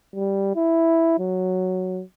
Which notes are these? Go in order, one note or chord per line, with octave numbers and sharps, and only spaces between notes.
G3
E4
F#3